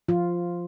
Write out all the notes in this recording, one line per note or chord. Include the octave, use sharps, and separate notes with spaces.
F3 F4